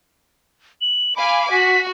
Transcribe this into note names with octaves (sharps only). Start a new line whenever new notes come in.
F#7
F5 G#5 B5 D6
F#4 B6